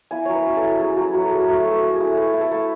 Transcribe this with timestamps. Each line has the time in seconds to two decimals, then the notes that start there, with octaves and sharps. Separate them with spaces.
0.11 E4 G#5
0.25 F#3 C#5
0.35 B4
0.46 C#4
0.56 A4
0.63 E4
0.79 F#3 G#4
0.97 F#3 F#4
1.14 F#3 F#4
1.24 A4
1.31 F#3 G#4
1.49 A3 B4
1.65 A3
1.72 A4
1.83 A3
1.94 G#4
2.01 E4
2.17 A3 B4
2.34 E4
2.41 A4
2.51 A3 B4